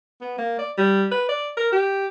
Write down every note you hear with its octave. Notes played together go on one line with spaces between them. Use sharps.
B3
A#3
D5
G3
B4
D5
A#4
G4